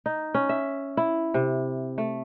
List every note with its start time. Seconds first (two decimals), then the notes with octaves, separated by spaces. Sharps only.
0.06 D#4
0.34 C#4
0.49 E5
0.97 E4
1.34 C3
1.98 A3